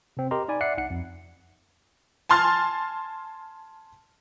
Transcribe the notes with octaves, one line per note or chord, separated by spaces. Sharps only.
C3 C4
G4 A#4 D#5 A#5 C6
D#4 D5 G#5 B5
D5 E5 F#5 F#6 C7 C#7
C2 D#4 F#5 C#7
F2
G#5 A5 C6 F6 A6